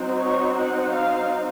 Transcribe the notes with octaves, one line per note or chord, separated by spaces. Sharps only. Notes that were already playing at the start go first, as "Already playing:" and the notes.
Already playing: F#3 C4 D#4
C#5
F#5
F5